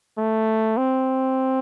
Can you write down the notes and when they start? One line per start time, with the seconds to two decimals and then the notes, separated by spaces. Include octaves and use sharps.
0.18 A3
0.77 C4